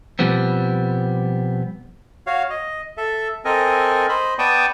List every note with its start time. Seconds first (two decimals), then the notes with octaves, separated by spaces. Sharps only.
0.19 B2 F3 G3 B3 C4
2.27 F#4 C#5 F5
2.50 D#5
2.97 A4 E5
3.45 C4 A4 A#4 D#5 G#5
4.09 C5 D#5 B5
4.39 B3 D5 G5 A5 C#6 D#6